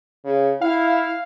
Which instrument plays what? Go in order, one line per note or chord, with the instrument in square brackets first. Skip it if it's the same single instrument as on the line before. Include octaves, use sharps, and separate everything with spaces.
[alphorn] C#3
[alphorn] E4 [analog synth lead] F5